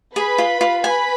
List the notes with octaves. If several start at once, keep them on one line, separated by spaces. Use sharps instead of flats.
G#4 B4 B5
F4
F4
B4 G#5 B5